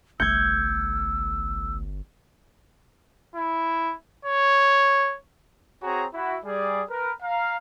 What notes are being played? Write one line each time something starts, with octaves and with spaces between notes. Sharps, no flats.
G1 C2 A3 E6 G6 G#6 C#7
E4
C#5
C4 F#4 G#4 C#5 G#5 A#5
E4 F#4
G3 G#4 D5
A#4 B4
F5 A#5